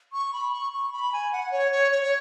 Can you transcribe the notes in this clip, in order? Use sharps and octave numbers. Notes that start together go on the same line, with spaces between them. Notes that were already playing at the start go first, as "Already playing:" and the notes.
C#6
B5
C#6
C#6
B5
G#5
F#5
C#5
C#5
C#5
C#5